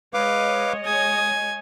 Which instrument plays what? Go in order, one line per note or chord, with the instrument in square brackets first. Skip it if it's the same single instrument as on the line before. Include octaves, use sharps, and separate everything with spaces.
[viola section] G#3 C#5 D#5 [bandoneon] B4 F5 D6
[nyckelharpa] G#5 [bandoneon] D#6